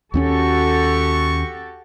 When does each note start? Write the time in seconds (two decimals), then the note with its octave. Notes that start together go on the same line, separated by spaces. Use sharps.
0.14 D#2 C4 C#4 F#4 G4 A4 C#6